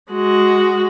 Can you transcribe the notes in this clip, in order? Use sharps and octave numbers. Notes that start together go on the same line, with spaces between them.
G#3 F#4